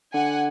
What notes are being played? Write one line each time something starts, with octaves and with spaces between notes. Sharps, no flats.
D3 F#5 G#5